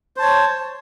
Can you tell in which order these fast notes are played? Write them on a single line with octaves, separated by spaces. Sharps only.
C5 A5 C#5